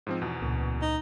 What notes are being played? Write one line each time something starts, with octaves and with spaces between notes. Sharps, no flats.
G#2 F3 C4
E2 B2
C#2 A#2
D#4